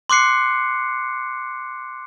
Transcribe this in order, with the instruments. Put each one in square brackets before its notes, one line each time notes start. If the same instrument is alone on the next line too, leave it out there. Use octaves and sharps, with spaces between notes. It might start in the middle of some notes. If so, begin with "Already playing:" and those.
[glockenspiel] C6 D6 F#6 C7 C#7